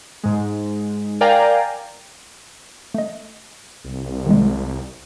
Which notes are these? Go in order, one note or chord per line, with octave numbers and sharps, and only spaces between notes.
G#2 G#3
A#4 D5 F5 G5 G#5 A#5
A3 D#5
C2
D#3 G3 G#3